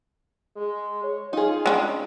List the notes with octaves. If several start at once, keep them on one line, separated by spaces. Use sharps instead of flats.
G#3
C#5
D#4 F4 G#4
G#3 C#4 D4